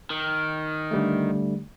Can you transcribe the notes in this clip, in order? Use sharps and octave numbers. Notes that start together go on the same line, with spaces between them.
D#3
D3 G3 A3